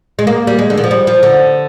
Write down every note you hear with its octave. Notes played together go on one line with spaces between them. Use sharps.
G#3
A#3
G3
G#3
D3
D#3
F3
G3
F3
D3